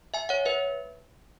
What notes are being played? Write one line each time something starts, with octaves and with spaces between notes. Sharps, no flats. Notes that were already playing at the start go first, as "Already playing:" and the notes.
E5 G#5
C#5 F#5
B4 E5